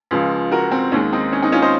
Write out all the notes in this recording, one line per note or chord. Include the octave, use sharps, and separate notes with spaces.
C#2 C#3 F3 G#3
F#4 A#4
C4
D#2 D#3 G#3 C#4
C4 D#4
C#4
C4 D#4
C#4 F4
C5 D#5